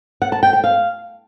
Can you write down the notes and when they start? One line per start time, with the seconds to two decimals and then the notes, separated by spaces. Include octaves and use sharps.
0.22 F#5
0.32 A5
0.43 G5
0.53 G5
0.64 F5